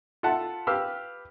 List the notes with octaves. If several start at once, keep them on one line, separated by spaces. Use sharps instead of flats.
F4 A4 E5 F#5 A5
G4 B4 F5 E6 F6